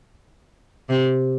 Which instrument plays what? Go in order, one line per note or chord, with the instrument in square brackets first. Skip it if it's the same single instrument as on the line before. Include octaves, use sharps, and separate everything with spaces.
[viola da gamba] C3